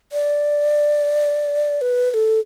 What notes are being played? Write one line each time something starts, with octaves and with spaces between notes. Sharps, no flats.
D5
B4
B4
A4